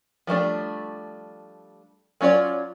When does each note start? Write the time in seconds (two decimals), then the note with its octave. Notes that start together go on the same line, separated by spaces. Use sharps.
0.27 F3 G3 A3 D4
2.21 F#3 C#4 F4 C#5 D5